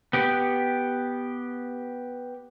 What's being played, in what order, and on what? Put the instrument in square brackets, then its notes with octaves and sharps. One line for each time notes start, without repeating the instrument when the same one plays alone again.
[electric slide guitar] B3 G4